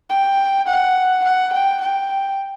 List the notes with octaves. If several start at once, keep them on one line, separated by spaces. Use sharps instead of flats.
G5
F#5
F#5
G5
G5